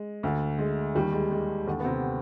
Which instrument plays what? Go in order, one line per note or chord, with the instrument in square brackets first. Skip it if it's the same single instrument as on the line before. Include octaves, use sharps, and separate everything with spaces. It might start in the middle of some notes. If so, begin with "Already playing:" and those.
Already playing: [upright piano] G#3
D2 D3
G#3
D#2 D#3 G3
G#3
G#3
D#2 D3
B3
C3 C4